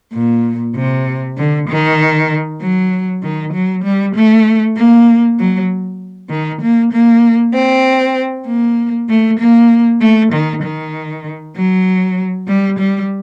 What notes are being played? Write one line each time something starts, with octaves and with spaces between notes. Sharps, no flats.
A#2
C3
D3
D#3
F#3
D#3
F#3
G3
A3
A#3
F#3
D#3
A#3
A#3
C4
A#3
A3
A#3
A3
D#3
D#3
F#3
G3
G3